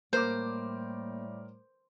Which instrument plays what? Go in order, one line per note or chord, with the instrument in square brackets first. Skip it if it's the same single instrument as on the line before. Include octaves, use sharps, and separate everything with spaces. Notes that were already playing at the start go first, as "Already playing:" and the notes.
[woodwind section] A2 G3 A3 [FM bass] A#3 [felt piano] A#4 D6 [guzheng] C5